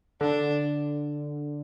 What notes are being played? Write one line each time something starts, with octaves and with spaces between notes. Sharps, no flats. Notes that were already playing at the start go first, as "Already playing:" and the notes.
D3 D4